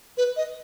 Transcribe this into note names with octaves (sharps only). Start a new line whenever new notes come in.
B4
D#5